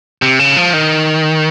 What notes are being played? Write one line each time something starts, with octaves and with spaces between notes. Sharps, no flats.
C3
C#3
F3
D#3